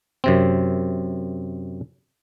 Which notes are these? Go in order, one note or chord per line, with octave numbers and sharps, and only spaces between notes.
F#2 C3 C4